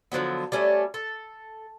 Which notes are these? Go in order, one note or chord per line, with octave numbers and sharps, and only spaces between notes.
D3 F3 F#3 B3
G3 A3 C#4
A4